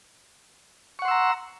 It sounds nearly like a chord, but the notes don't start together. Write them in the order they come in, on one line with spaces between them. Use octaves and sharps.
C#6 F#5 C6 E6 A#5